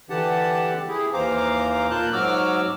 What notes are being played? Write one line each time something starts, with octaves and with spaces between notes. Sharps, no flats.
D3 E3 G4 F#5 A5
E4 G4 G#4
D#2 E3 C5 F5 A#5 D6
A#2 F4 A#4 A5 F#6 G6
G#2 F#3 F#4 D6 E6 F6